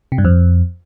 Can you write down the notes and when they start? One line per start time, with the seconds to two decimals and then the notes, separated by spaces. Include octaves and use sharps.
0.12 C3
0.18 G2
0.25 F2